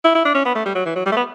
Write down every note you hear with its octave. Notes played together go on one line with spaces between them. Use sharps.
E4
E4
D4
C#4
B3
A3
G3
F#3
E3
F#3
G3
A3
B3